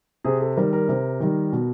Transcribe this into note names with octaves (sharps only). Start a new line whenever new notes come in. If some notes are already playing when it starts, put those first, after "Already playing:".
C3 G#4
A4
D#3 G3 A#4
A#4
C3
D#3 G3
B2